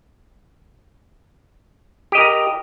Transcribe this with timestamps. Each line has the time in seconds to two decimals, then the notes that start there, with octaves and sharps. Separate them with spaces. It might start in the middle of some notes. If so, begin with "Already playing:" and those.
2.12 G4
2.15 D#5
2.18 A#4
2.21 A#5